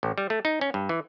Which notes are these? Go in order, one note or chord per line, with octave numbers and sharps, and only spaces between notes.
A1
G3
A3
D#4
C#4
G2
E3